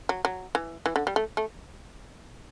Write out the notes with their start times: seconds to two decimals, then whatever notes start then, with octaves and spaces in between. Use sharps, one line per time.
0.09 F#3
0.25 F#3
0.55 E3
0.86 E3
0.96 D3
1.07 G3
1.16 A3
1.37 A3